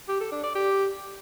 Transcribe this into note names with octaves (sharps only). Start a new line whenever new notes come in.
G4
A4
D4
D5
G4